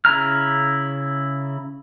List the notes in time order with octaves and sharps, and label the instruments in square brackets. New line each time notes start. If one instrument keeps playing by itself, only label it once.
[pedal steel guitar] C#3 E4 A#5 F6